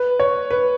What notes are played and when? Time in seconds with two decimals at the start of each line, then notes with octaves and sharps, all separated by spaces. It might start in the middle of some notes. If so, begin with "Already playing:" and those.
Already playing: B4
0.20 C#5
0.51 B4